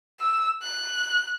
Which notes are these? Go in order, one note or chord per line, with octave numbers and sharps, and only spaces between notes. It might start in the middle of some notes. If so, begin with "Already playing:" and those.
E6
F#6